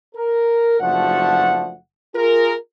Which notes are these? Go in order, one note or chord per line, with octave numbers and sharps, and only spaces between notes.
A#4
F#1 F3 A3 D4 F#4 F#5
F4 G#4 A#4